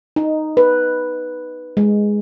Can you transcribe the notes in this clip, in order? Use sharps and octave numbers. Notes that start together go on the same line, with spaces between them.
D#4
B4
G#3